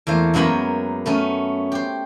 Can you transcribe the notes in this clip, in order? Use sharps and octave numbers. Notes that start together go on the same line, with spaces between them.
E2 A3 A#3 C5
F#2 G#3 A#3 B3 C#5 B5
A3 B3 C#4
G4 C5